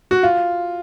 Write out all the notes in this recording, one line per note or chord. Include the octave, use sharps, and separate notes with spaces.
F#4
F4